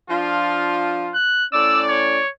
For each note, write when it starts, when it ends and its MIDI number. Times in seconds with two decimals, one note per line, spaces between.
0.10 1.13 53
0.10 1.13 62
0.10 1.13 65
1.15 1.46 90
1.53 2.19 45
1.53 2.19 61
1.53 2.19 74
1.53 1.82 88
1.89 2.30 73